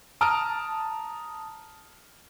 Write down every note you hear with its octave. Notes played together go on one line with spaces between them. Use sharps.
A5 A#5 D#6 F6 D7